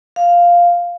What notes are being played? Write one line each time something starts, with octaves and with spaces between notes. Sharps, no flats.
F5